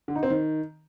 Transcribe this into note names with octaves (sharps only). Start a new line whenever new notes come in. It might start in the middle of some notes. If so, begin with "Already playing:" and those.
D3
D#4
C4
D#3